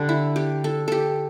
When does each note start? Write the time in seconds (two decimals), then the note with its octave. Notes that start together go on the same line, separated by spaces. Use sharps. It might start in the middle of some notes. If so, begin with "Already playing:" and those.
Already playing: D3 G3 D4
0.09 E4
0.36 G4
0.64 A4
0.88 G4 A4